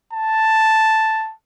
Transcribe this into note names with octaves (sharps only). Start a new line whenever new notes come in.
A5